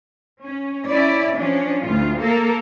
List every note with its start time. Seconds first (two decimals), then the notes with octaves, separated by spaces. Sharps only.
0.43 C#4
0.90 C#4 E4 D5
1.37 F3 C#4 D4
1.84 D2 A2 F4
2.21 A#3 A4 A#4